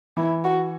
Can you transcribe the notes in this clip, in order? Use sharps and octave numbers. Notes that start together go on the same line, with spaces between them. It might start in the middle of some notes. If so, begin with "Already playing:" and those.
E3 E4
F#4